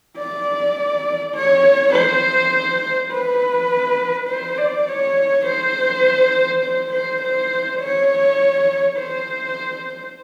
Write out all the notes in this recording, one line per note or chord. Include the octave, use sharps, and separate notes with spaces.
D5
C#5
C5
B4
C5
D5
C#5
C5
C5
C5
C5
C#5
C5